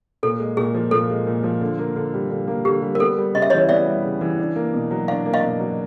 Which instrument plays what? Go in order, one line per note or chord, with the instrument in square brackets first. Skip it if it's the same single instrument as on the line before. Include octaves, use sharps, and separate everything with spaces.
[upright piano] A#2 [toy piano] A4
[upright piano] G#3
[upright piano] A#2 [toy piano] G#4
[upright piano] F3
[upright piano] A#2 [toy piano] A4
[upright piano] G#3
A#2
F3
D3
A#3
D3
G3
D3
A#3
[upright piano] D3 [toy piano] G4
[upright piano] G3
[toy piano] A#4
[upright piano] B3 [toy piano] A4
[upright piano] G3
[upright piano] C#3 [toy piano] D#5
[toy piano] E5
[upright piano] E3 [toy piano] C#5 D#5
[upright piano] B3 [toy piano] D5 E5
[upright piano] G3
C#3
E3
D4
A#3
B2
F#3
[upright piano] D4 [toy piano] F5
[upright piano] A#3
[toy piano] D#5 F5
[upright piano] B2
F#3